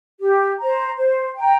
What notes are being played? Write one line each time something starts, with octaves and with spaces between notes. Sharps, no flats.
G4
C5 A#5
C5
G5 A#5